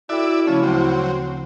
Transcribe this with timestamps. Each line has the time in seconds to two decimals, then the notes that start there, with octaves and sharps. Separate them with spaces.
0.09 E4 F#4 A4 D5 E5 G5
0.47 C#3 F3 A3 C#4
0.63 D2 C#3 F#3 C4